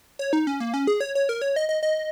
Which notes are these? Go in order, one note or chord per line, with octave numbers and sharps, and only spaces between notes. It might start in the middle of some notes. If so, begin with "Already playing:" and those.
C#5
D#4
C#4
A#3
C#4
G#4
C#5
C#5
A#4
C#5
D#5
D#5
D#5